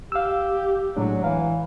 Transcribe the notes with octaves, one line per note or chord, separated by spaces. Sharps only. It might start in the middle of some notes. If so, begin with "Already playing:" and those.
G4 F5 E6
A2 F#3 G#3 D4
E3 F5